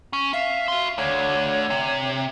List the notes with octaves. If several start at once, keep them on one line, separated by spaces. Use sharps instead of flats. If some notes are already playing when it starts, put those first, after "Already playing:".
C#4
E5 F5
F#4 C6
D2 D3 C#5
C3